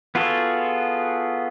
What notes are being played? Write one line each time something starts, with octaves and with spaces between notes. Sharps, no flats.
B3 F4 F#4 G#4 A4